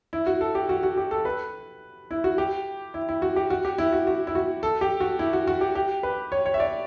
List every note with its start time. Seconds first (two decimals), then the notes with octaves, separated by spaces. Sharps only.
0.13 E4
0.27 F#4
0.41 A4
0.55 G4
0.69 F#4
0.83 F#4
0.98 G4
1.11 A4
1.25 B4
2.11 E4
2.24 F#4
2.38 G4
2.94 E4
3.09 E4
3.22 F#4
3.36 G4
3.50 F#4
3.65 G4
3.78 E4
3.93 F#4
4.07 F#4
4.27 E4
4.35 F#4
4.63 A4
4.81 G4
5.00 F#4
5.19 E4
5.33 F#4
5.47 F#4
5.61 G4
5.75 G4
6.03 B4
6.32 C#5
6.46 C#5
6.54 E5
6.60 D5